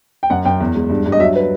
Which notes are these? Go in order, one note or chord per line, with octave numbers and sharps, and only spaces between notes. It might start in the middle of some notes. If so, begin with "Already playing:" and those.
G5
F#2 F#5
F#2 G5
E2
G#3
G2
G2
D#5
F#3 E5
B4